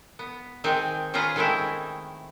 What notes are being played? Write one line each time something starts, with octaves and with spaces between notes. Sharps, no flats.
B3
D#3 G#3 C4 G#5
C#4 F4 G#4 B4 F5 A#5
D#3 G#3 A3 C4 E4